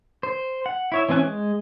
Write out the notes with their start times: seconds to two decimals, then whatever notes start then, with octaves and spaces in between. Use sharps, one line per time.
0.23 C5
0.66 F#5
0.92 E4 C#5 E5
1.09 E3 C4 C#4 G#5 F#6
1.23 G#3